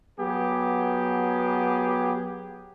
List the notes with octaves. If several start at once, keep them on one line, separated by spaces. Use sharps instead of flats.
F#3 B3 G4 G#4